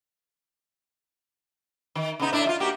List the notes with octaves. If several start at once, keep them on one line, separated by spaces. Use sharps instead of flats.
D#3
C#3 B3 D#4
A2 D4 E4
G#3 F4
A#3 F#4 G4